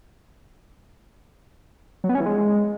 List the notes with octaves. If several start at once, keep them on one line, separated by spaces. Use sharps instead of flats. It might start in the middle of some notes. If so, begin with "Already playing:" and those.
F#3
B3
C#4
E3
G#3